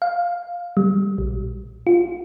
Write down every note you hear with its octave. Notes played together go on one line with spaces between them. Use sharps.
F5
G3
A#1
F4